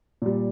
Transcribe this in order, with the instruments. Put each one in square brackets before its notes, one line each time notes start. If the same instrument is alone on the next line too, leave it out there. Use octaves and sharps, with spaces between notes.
[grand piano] A#2 G3